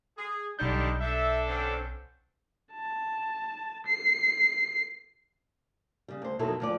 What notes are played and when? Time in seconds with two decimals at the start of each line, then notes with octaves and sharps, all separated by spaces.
0.17 G#4
0.59 B1 D3 G3 D4 D#4 G6
1.00 D4 A4 E5
1.47 D3 C4 C#4
2.73 A5
3.86 C7
6.08 C#3 G3
6.22 D2 C5
6.39 F2 B2 D#3 F#3 E4 A4
6.60 D2 F3 D5